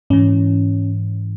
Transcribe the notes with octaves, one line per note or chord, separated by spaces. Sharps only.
G#2 E3 C#4